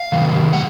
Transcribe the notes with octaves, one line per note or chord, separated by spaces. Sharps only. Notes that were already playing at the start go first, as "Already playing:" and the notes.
Already playing: F5
C3 D#3 F#3
F#5